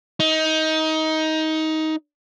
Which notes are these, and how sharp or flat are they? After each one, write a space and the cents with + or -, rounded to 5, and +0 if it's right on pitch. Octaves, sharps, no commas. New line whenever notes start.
D#4 +20